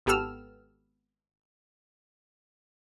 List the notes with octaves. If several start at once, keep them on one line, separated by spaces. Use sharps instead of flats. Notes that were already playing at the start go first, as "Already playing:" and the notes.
G#1 B3 G4 A4 E6 F6